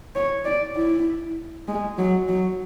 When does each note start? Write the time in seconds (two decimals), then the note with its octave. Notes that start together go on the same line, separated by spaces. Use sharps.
0.15 C#5
0.45 D5
0.76 E4
1.68 G#3
1.98 F#3
2.29 F#3